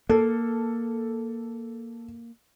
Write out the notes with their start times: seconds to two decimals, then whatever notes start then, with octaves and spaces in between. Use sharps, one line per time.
0.09 A#3 A4